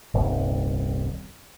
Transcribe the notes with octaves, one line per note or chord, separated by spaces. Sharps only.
D#1 C2 G2 D#3